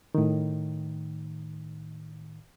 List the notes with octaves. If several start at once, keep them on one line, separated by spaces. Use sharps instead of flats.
A2 D#3